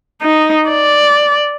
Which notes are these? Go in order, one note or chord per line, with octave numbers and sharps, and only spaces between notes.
D#4
D5